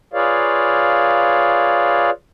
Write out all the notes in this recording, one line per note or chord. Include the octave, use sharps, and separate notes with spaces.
F4 G#4 B4 C#5 D5 F5